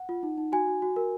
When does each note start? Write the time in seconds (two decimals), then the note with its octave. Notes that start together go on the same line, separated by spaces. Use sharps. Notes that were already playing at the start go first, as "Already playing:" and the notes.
Already playing: F#5
0.09 F4
0.23 D#4
0.38 D#4
0.52 F#4 G#5
0.67 F#4
0.82 F#4
0.96 A#4